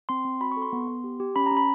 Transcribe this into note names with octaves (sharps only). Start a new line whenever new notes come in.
C4 C6
C4
F#4 B5
C#6
A4
C6
B3
B3
G4
G4
C#4 B5
A#5
C#4
B5